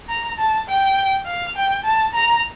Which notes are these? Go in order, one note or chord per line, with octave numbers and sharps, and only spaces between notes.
A#5
A5
G5
F5
G5
A5
A#5